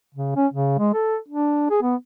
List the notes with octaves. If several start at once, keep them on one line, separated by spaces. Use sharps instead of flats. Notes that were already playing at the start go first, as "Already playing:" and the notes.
C#3
C#4
C#3
G#3
A4
D4
G#4
B3